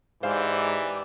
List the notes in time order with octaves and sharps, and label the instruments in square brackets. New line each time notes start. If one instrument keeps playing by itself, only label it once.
[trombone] G#2 [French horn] E3 [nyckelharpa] G4 D5 [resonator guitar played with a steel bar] C5 F5